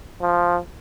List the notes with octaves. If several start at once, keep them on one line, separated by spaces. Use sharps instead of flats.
F3